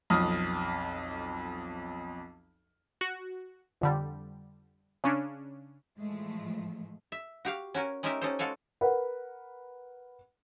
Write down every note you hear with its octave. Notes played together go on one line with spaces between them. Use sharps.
B1 F2 D#6 F6
F#4
F2 D3 G3
C#3 C#4 D4
A2 E3 F3 G#3 A3
E5
F#4 G4 F5
C#4 F#4 A#4 G#5
G#3 C#4 D#4 G4 A#4 E5
C#4 D#4 G4 A4 C5
G#3 F#4 A4 F5 G#5
A#4 B4 F#5